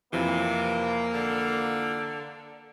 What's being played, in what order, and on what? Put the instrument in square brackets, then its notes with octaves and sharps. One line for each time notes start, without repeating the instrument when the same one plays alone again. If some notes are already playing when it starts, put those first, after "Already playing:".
[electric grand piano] F2 E3 [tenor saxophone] C3 [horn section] A#3
[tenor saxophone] D3